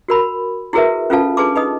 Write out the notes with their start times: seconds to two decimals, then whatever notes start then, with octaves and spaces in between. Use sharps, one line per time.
0.08 F#4 A#4 B5
0.73 E4 F#4 G#4 A#4 B4 E5
1.10 C#4 F4 A4 B4 F5 A5
1.37 D4 G#4 B4 A5 C6 D6
1.56 D#4 B4 D#5 D#6